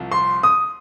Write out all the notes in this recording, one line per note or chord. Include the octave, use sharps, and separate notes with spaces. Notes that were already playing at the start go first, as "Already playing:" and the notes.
Already playing: C2 C3 F3
C6
D#6